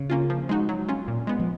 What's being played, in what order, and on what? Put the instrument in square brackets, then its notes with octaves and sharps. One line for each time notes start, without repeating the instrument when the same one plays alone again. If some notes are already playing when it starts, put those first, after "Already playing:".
Already playing: [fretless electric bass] C#3
[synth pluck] A#3 C#4 F4
F3
G#3 D#4 F#4
F#3
C#4 F4
A#2
G#3 B3
[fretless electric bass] F3